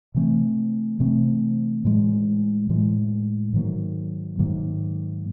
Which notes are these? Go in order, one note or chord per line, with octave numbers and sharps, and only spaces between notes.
C3 E3 A3 C4
C3 E3 A3 C4
A2 E3 G#3
A2 E3 G#3
G#2 D#3 F#3 A#3
G#2 D#3 F#3 A#3